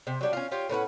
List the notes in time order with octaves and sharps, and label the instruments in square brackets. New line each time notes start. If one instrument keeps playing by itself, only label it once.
[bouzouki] C3
F#3 G3 D4
C#4 F4
F4 G4 C#5
A2 C#4 B4 F#5